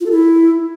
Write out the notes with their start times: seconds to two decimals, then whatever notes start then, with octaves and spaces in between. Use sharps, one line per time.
0.01 F4
0.06 A4
0.11 E4